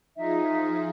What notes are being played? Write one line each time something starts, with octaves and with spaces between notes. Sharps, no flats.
F3 D#4 F4 G#4 E5